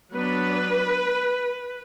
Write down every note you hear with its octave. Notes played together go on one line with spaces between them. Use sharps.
F#3 B3 D4 B4